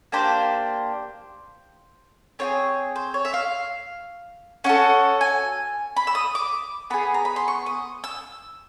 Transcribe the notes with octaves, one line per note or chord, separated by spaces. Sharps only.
A#3 D4 G4 C5
C4 F4 G#4 C#5
C5
C#5
E5
F5
C#4 F#4 A4 F#5
G#5
B5
E6
D#6
D6
B3 D#4 G#4 B5
A#5
B5
C6
C#6
D#6
E6